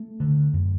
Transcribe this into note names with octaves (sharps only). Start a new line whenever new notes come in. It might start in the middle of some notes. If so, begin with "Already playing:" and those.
Already playing: A3
D3
F#2